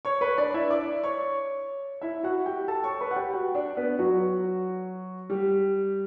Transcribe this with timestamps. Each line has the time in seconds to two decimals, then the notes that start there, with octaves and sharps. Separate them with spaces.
0.05 C#5 C#6
0.21 B4 B5
0.38 D4 D5
0.54 E4 E5
0.70 D5 D6
1.04 C#5 C#6
2.02 E4 E5
2.23 F#4 F#5
2.46 G4 G5
2.68 A4 A5
2.84 C#5 C#6
3.01 B4 B5
3.11 F#5
3.16 G4 G5
3.33 F#4 F#5
3.55 D4 D5
3.77 B3 B4
3.99 F#3 F#4
5.30 G3 G4